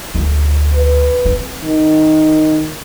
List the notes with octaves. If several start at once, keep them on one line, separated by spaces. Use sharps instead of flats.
D2
B4
C4
D#3